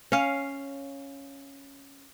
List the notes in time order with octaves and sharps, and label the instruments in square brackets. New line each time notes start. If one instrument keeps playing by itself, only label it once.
[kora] C#4 F5